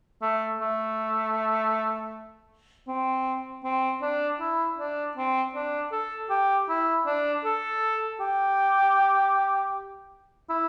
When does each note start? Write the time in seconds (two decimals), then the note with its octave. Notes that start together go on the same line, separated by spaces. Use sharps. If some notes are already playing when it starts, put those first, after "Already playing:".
0.22 A3
0.61 A3
2.88 C4
3.64 C4
4.02 D4
4.40 E4
4.79 D4
5.17 C4
5.55 D4
5.92 A4
6.30 G4
6.69 E4
7.06 D4
7.45 A4
8.20 G4
10.49 E4